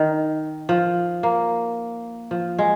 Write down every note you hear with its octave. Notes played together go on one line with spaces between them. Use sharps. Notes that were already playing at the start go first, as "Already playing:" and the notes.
Already playing: D#3
F3
A#3
F3
G#3